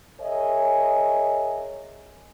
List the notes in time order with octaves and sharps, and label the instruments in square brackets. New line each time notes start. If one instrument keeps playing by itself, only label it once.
[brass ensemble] G#4 A#4 C#5 D#5 E5 G#5